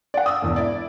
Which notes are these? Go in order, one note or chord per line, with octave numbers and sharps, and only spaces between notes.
D5 F#5
D#6 E6
E1 E2
E4 D5